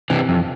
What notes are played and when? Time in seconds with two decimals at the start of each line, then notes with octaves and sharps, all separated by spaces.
0.10 C3 E3
0.29 F2